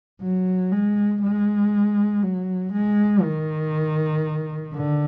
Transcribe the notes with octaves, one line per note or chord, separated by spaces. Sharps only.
F#3
G#3
G#3
F#3
G#3
D#3
D3